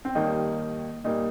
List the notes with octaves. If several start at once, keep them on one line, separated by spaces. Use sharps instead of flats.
C4
D#2 D#3 G3 A#3 D#4
A#2 G3 A#3 D#4